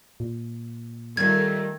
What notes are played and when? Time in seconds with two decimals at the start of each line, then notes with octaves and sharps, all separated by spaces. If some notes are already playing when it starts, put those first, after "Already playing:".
0.20 A#2
1.17 D#3 G3 A3 F4 G#6